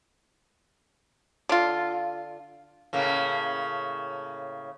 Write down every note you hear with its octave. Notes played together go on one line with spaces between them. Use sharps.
D3 F4
A2 C#3 A#3